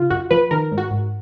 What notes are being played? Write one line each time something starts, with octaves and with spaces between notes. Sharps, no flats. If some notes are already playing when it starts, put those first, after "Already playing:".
Already playing: C#3 F4
F#2 F#4
F3 B4
D#3 A#4
G#2
F#4
G#2